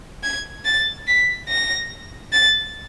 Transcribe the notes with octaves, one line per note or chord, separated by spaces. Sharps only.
G#6
A6
B6
A#6
A6